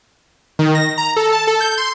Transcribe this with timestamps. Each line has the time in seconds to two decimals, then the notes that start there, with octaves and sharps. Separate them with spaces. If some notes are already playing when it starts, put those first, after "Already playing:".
0.59 D#3
0.75 A#6
0.98 A#5
1.16 A4
1.32 A5
1.47 A4
1.60 G6
1.78 C6